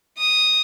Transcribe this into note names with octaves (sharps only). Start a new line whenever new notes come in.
D#6